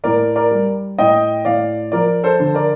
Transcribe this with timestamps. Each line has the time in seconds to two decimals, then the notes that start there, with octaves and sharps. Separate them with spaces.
0.04 A2 A#4 D5
0.36 A#4 D5
0.51 G3
0.98 A2 D#5 G5
1.45 A2 D5 F5
1.92 F3 A#4 D5
2.24 A4 C5
2.40 D3
2.54 A#4 D5